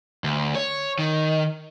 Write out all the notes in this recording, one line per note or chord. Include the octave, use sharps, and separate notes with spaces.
D2
C#5
D#3